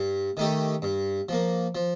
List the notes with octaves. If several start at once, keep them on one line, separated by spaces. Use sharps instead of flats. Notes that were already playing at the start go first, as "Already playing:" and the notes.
Already playing: G2
D#3 A3 D#4 G4
G2
F3 A#3
F3